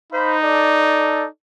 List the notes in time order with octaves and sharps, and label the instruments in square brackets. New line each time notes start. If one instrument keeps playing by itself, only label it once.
[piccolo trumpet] D#4 [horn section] C5 F5 B5
[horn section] A4 D5